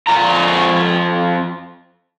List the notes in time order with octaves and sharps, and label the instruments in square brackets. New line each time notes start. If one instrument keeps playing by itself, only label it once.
[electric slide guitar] F2 F4 A#5